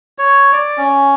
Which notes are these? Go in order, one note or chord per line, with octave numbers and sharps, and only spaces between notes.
C#5
D5
C#4